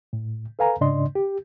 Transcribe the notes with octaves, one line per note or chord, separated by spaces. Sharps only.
A2
A4 B4 F5 G#5 A#5
G#2 C#3 D4 D5 D#5 C6
G4